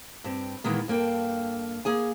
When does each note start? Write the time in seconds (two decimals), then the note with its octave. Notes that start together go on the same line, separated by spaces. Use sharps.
0.24 G2 C4
0.64 A#2 D#3 E3 G#3 B3
0.88 G2 A#3 A4 G5
1.85 A#3 G#4 G#5